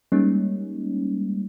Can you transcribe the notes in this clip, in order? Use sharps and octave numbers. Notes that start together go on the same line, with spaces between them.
G3 G#3 A#3 C#4 D#4